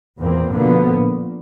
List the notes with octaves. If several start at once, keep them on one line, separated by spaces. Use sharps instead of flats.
G#1 E2 A#2 A#3 C4
B2 D3 F3 A#3 B3
A#2